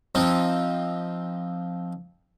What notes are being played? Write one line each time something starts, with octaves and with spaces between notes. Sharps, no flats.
F3 C4 D#4